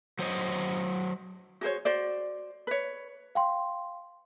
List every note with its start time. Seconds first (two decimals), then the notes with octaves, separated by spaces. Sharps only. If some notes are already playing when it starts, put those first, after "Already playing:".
0.19 F#3 C5 C#5 D#5
1.61 F#4 G#4 C5 C#5
1.85 F#4 C5 D5
2.67 B4 C#5
3.35 F5 G5 C6